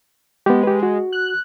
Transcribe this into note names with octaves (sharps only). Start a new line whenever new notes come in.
G#3 B3 G4
G4 B4
F#4
F#6